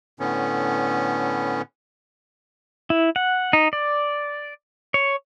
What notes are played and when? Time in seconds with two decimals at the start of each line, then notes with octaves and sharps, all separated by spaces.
0.20 A2 D3 B3 C#4
2.90 E4
3.16 F#5
3.53 D#4
3.73 D5
4.94 C#5